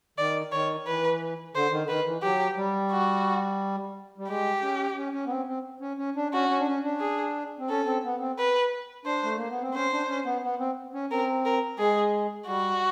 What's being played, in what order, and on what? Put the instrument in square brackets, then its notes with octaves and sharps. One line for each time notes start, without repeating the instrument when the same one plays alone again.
[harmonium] D#3 [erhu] D5
[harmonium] D#3 [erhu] C#5
[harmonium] E3 [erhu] B4
[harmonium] D3 [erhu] C5
[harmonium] D#3
D3
[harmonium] D#3 [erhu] B4
[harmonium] E3
[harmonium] F#3 [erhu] G4
[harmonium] G3
[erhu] F#4
[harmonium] G3
[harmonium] G#3 [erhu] G4
[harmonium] C#4
C#4
C#4
B3
C4
C4
C#4
C#4
D4
[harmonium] C#4 [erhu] F#4
[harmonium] C#4
D4
C#4
D4
[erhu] G#4
[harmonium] C4
[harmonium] C#4 [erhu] A4
[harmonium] C4
B3
C4
[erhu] B4
[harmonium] D4 [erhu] C5
[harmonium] A3
A#3
B3
C4
[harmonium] C#4 [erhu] C5
[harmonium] D4
C#4
B3
B3
C4
C#4
[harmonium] C4 [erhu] A#4
[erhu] A#4
[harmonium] G#3 [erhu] G#4
[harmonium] G3 [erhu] F#4